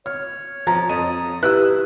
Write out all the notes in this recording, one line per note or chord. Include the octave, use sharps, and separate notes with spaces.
C#5 F6
F3 A#5
F2 D#6
E4 G4 B4 E6 F#6